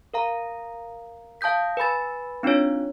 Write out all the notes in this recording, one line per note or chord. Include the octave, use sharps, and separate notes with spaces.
A#4 F5 A#5
F5 A5 D#6 G6 B6
B4 G#5 B5 A6
C4 D4 D#4 F4 C#5